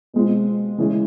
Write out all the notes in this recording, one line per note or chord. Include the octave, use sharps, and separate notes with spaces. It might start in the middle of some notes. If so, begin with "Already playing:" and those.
B2 G#3 C4 F4
C#3 E3 G#3 C#4